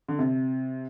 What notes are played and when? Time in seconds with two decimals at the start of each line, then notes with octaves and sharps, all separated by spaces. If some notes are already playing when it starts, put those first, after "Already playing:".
0.08 D3
0.19 C3